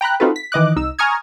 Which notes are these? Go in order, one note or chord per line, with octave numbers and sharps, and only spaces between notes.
G5 A#5 B5 F#6
C4 D#4 F4 F#4 A4 B4
B6
D#3 E3 D#5 D6 F#6
C2 D#4 E6
G#5 A#5 C#6 D#6 F6 G#6